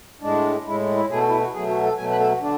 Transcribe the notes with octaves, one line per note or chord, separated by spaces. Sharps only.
A2 G#3 D4
A2 G#3 E4
E4
B2 A3 G#4
F#4
E4
F#4
B2 F#3 A3 G#4
F#4
A4
B2 F#3 A3 G#5
B4
A4
F#4
D3 D4